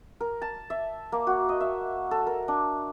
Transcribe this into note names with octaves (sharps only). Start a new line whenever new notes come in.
A#4
A5
E5
A#3
F#4
D#5
E5
A4
A#4
D4